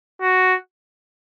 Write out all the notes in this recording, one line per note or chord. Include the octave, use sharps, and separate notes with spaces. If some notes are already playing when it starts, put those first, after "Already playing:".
F#4